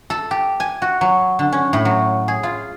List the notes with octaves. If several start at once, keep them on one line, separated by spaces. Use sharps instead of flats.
A4
G4
G#5
F#4
F#3
D3
C#4
A2
F#3
G#4
F4